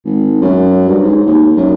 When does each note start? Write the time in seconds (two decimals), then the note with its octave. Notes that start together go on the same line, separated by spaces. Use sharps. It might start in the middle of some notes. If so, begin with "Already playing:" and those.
0.05 G#1
0.42 F#2
0.88 G2
1.04 G#2
1.27 D#2
1.57 F#2